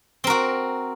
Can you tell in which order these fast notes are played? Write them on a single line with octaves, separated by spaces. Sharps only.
C4 A#4 F#4